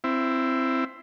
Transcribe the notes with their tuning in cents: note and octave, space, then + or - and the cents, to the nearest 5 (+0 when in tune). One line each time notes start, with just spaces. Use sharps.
C4 +0 E4 +15